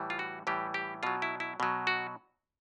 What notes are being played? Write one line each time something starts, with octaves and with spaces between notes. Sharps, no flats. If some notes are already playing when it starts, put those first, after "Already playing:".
Already playing: A2 E3 G3
F4
F#4
A2 E3 G3 G4
G4
B2 F#3 F4
E4
E4
B2 F#3
F#4